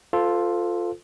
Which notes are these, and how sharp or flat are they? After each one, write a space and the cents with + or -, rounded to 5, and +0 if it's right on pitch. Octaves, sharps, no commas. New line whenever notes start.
F4 +0 A4 +0 C5 -40